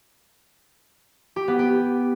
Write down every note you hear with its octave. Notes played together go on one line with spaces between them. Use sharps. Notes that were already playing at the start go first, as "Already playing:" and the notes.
G4
B3
G4